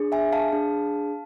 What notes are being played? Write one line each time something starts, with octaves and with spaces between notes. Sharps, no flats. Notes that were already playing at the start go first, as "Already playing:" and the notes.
Already playing: D4 G#4
E5 G#5
F5 A5
D4 G#4